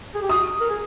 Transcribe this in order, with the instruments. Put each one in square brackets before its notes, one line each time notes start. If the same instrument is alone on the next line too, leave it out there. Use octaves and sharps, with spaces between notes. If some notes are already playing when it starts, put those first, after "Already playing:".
[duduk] G#4
G4
[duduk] F#4 [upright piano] D#6
[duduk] A#4
G#4